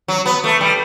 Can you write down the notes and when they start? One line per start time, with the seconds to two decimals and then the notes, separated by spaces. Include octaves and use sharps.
0.08 F#3
0.26 B3
0.44 A3
0.61 G3